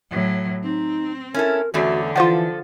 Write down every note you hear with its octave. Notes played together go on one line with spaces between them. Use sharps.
A2 F#3
C4 D#4
C#4 E4 A4 A#4
E2 D3 A3 C#4 F#4
E3 F3 F4 A4 C5 F#5